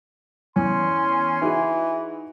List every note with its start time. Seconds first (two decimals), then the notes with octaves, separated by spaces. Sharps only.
0.56 E2 C#4 C6
1.42 E3 D#4 F#4 G#4